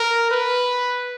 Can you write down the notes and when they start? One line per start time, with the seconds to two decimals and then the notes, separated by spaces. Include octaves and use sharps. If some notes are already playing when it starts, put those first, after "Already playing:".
Already playing: A#4
0.31 B4